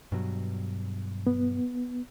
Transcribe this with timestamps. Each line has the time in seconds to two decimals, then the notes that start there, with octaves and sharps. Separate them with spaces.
0.12 G2 B2 F#3
1.27 B3